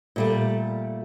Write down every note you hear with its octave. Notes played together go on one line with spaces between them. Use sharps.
A#2 G3 A3